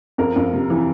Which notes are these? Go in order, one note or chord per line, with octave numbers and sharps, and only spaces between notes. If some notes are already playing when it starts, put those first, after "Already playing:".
F2 A#4
F2
C3
E3